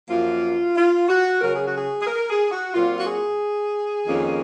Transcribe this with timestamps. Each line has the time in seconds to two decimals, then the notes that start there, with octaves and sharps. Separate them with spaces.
0.09 F#2 F3 A#3 F4
0.76 F4
1.08 F#4
1.41 C#3 F#3 C#4 A#4
1.53 G#4
1.65 F#4
1.77 G#4
2.01 G#4
2.07 A#4
2.30 G#4
2.51 F#4
2.73 A#2 F#3 C4 F4
3.00 F#4
3.06 G#4
4.05 F2 D#3 A#3 C#4